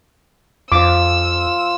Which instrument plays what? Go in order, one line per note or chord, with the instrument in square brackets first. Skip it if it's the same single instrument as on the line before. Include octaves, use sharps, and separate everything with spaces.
[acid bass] F2 [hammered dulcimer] F3 F4 [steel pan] D6 [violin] E6